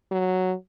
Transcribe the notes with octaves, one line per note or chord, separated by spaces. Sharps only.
F#3